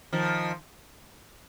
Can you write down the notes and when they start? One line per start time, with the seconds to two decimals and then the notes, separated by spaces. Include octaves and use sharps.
0.13 D#3 F3